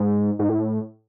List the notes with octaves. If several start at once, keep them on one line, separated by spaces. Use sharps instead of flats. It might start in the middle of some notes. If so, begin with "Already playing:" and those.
Already playing: G#2
G#2
A2